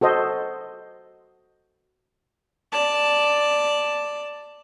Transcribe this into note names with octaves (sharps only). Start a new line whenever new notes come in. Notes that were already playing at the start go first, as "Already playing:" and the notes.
F#4 A4 C5 D#5
D5 A5